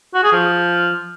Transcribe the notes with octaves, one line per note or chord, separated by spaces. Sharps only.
F#4
G#4
F3